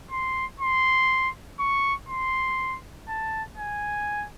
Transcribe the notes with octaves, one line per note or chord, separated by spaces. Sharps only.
C6
C6
C#6
C6
A5
G#5